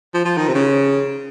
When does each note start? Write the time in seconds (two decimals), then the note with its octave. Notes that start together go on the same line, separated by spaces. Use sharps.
0.14 F3
0.25 F3
0.37 D#3
0.48 C3
0.54 C#3